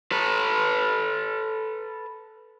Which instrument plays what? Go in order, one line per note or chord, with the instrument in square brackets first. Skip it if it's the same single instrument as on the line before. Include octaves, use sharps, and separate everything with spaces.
[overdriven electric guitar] A4 B4